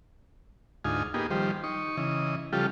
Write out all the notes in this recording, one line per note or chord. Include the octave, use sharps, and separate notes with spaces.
D2 G#2 D#4 F4 G#5
A#3 B3 D#4 G4 G#4
D#3 F3 G3 G4 C5
D#4 C#6
C#3 E3 D#5
C#3 F3 G3 F4 G4 A4